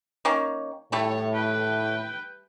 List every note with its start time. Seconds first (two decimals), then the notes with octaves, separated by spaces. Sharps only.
0.25 D#3 A#3 C#4
0.92 A2 G3 A3 A4 C#5
1.33 B4 G5